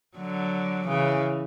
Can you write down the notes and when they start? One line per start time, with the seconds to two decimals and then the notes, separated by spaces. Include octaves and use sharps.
0.18 D3 F#3
0.87 C#3 E3